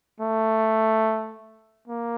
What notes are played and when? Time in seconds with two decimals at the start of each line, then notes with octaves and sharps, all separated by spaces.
0.20 A3
1.88 A#3